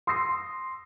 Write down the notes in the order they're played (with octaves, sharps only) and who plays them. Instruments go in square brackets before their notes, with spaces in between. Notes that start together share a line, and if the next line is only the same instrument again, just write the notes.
[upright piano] C6 D#6 E6 A#6 C7